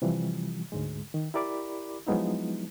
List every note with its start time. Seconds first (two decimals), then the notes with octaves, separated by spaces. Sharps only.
0.02 C3 E3 F3 G3
0.72 D2 G#2 G#3
1.14 D#3
1.34 E4 G4 A#4 D5 B5 D6
2.07 F3 F#3 G#3 B3 D#4 E4